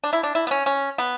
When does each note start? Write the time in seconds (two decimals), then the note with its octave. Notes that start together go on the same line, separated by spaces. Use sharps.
0.04 D4
0.13 E4
0.23 D4
0.35 E4
0.47 B3
0.51 C#4
0.66 C#4
0.98 B3